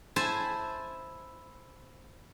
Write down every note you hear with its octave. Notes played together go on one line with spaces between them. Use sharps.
E4 C5 G#5 A5